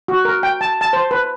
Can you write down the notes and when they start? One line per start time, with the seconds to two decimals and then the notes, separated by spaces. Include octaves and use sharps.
0.08 F#4
0.25 A#4
0.43 G5
0.61 A5
0.81 A5
0.93 C5
1.11 B4